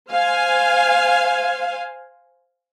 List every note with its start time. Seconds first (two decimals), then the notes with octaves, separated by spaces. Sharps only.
0.11 C5 F5 G#5